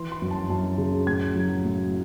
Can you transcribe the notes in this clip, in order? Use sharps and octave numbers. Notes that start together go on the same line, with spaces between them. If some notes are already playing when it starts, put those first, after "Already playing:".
Already playing: E3 C6
C6
F#2
A5
F#2 A5
C#3
A2 G#6
F#3
A2